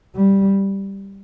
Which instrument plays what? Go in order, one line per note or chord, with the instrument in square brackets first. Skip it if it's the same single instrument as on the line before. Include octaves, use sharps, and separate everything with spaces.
[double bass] G3